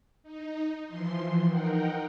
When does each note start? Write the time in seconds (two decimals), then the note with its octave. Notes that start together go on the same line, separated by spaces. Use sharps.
0.23 D#4
0.88 E3 F3 C6
1.48 D#4 A#4 F#5 G5